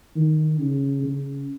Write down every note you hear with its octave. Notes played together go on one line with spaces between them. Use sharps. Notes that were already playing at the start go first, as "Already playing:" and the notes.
D#3
C#3
C#3